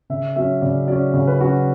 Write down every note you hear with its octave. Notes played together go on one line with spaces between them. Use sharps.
C#3 E5
F#3 C#4 E5
C#3 D5
F#3 C#4 D5
C#3 C#5
B4
F#3 C#4 F#4